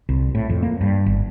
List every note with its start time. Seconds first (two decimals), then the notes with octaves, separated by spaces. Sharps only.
0.09 C2
0.35 A2
0.50 F2
0.63 A#3
0.81 G2
1.06 G1